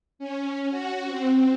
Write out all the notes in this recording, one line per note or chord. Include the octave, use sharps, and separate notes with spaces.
C#4
F#4
C4